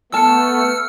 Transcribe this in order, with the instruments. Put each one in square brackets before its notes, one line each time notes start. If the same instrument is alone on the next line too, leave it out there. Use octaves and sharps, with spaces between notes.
[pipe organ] A3 B3 [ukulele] A4 A5 [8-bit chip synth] E6 F6 C#7